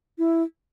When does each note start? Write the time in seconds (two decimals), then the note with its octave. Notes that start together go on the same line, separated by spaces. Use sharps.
0.19 E4